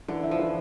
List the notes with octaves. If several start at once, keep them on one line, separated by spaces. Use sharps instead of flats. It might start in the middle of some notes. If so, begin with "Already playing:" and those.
D3 E3
E4
F3
E3